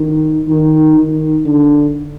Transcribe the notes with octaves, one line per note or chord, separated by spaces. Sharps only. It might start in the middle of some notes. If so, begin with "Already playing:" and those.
Already playing: D#3
D#3
D#3
D3